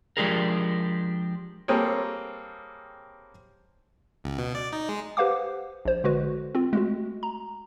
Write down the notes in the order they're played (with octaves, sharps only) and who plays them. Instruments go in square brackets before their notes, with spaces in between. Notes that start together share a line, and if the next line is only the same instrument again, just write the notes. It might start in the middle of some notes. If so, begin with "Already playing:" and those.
[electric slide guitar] F3 G#3 D4 G4 G#4 A#4
[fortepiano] G3 A#3 C4 G#4 A4 C#5
[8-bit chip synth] C#2
B2
D5
D#4
G#3
[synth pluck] G4 B4 C5 F5 F#5 D6
A#1 C5
D3 G#3 F#4 B4
C4 F4
G#3 A3 F#4
A#5